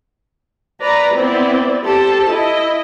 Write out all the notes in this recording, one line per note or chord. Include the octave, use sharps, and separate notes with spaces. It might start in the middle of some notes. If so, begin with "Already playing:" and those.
B4 D5 A#5
B3 C4 E4 D5
G4 A4 C5 A5
E4 D#5